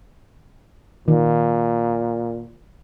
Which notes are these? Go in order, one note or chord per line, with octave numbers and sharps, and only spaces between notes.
A#2 D#3